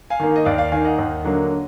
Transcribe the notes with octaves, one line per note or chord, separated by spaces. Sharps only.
F5 G#5
D#3 A#3
D#5
D#2 D5 F5
D5 F5
D#3 A#3 F5 G#5
D#5 F#5
D#2
D3 F#3 A#3